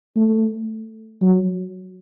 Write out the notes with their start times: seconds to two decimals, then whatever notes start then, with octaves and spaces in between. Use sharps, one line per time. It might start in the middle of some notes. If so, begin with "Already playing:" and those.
0.16 A3
1.22 F#3